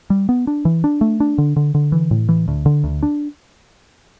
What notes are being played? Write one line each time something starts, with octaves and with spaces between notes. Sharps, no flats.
G3
B3
D4
E3
D4
A3
D4
D3
D3
D3
E3
A2
E3
D2
D3
D2
D4